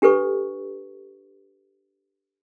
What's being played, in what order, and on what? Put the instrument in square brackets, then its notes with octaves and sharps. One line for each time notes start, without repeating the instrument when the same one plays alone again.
[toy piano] D4 G4 A4 B4 C#6